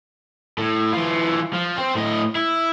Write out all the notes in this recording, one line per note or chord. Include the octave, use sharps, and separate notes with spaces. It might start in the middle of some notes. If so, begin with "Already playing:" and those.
A2
E3 F4
F3
C4 C5
A2 D#5
E4